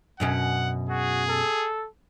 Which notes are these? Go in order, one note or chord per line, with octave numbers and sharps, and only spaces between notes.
F#2 B2 C#4 F#5
F#4 G#4
A4